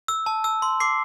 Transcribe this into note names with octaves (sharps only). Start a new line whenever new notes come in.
E6
A5
E6
C6
D6 C7